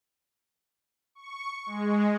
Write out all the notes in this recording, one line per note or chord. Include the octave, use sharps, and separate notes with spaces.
C#6
G#3